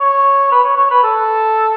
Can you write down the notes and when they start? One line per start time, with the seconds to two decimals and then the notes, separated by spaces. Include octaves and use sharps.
0.01 C#5
0.52 B4
0.65 C#5
0.77 C#5
0.90 B4
1.03 A4